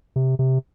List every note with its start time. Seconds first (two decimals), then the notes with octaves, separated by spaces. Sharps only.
0.16 C3
0.39 C3